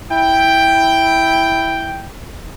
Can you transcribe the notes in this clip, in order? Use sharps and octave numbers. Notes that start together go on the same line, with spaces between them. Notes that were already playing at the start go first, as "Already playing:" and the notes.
E4 G5